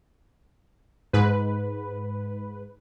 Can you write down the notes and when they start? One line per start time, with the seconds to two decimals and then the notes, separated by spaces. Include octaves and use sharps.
1.13 G#2 B4